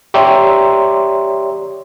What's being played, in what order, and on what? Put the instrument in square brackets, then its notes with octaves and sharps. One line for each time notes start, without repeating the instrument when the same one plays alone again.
[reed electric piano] G4 C#5 D5 E5 A#5 C6